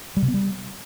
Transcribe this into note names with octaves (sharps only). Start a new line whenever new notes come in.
G3
C3
B3
G3